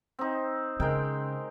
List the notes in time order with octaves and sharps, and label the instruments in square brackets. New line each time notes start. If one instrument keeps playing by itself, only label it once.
[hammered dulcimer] C4 D#4
[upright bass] C#3 [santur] G#3 A#4 G5